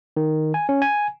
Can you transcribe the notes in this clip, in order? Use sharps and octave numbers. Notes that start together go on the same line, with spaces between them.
D#3
G#5
C#4
G#5